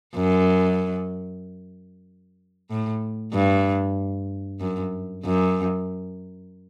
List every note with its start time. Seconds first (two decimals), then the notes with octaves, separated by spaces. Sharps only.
0.15 F#2
2.70 A2
3.33 G2
4.60 F#2
5.25 F#2